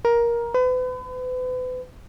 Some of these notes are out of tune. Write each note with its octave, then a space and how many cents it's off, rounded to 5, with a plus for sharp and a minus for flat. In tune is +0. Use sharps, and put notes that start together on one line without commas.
A#4 +15
B4 +40